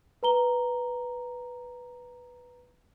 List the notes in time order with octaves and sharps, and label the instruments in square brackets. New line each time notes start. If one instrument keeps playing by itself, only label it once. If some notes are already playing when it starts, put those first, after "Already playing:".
[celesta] B4 A#5 G7